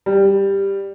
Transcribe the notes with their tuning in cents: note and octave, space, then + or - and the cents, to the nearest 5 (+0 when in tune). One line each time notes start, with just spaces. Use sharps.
G3 +5